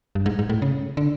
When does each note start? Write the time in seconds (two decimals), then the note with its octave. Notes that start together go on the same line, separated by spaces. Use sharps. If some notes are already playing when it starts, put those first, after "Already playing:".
0.15 G2
0.26 G#2
0.39 G#2
0.49 A2
0.62 C#3
0.97 D3